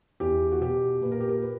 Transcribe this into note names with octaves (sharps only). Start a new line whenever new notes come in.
E2 G4
F#4
B2 G4
A#2 B4
A#4
G4
A#4
B4